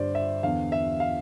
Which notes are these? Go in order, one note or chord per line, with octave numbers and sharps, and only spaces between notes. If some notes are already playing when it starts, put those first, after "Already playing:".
Already playing: G2 D3 C5 D5
E5
E2 D3 F5
E5
F5